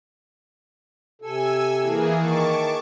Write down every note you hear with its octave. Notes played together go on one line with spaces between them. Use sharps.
C3 A4 G#5 E6
E3 A#3 G#4
D#3 A5 C#6 D6